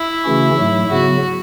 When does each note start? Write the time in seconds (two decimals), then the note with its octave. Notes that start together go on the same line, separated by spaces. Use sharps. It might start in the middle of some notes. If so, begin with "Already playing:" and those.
Already playing: E4
0.24 C#3 E3 A3 C#4 F#4
0.57 G#2 F#3 A3
0.90 C#3 F#3 B3 F#4